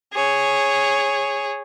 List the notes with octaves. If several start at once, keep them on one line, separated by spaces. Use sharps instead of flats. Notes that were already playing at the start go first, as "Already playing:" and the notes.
G#4 C#5